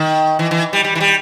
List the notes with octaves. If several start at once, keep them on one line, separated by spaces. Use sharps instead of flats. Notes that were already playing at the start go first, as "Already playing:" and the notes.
Already playing: D#3
E3
E3
G3
G3
E3
G3